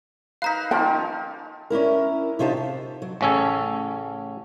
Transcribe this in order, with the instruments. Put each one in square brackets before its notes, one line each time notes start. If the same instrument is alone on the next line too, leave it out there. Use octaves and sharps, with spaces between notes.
[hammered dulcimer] D#4 A#4 B4 [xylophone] F5 A#5 B6
[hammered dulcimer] D#3 A#3 D#4 [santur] F3 C#4 F4 [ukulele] G5
[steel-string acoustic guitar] C#4 D4 E4 A#4
C3 C#4 D#4 F4 G4 A5
C3
F#3
[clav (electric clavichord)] A1 C#3 C#4 A4 G#5